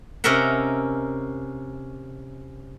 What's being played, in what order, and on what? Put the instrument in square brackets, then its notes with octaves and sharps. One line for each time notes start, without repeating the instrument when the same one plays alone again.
[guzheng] C3 C#4 A#4 D#5 E5 F#5